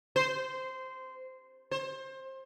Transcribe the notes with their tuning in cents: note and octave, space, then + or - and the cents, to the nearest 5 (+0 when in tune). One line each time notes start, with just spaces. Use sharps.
C5 -15
C5 +25